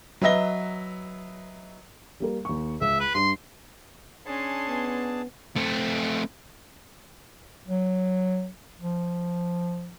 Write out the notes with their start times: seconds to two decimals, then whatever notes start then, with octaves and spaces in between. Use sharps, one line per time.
0.21 F#3 B4 D#5 E5 A#6 G7
2.20 G3 A#3 A#4
2.45 D#2 C#6
2.81 C#2 E5
3.00 B4
3.15 G2 C6
4.26 C#4 D4 G#4 A5 C6
4.68 B3
5.56 A3 C4
7.67 F#3
8.80 F3